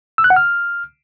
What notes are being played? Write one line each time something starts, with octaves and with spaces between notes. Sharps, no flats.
E6
F#6
F#5
F6